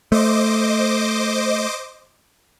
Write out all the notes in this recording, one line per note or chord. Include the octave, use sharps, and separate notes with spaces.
A3 C5 D#5 D6